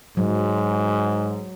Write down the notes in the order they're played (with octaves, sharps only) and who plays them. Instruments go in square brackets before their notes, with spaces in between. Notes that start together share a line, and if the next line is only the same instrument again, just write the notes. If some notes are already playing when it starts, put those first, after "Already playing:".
[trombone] G#2 [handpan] F#3